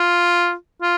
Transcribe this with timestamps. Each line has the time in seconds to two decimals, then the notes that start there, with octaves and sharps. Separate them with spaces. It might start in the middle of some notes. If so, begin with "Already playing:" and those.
Already playing: F4
0.82 F4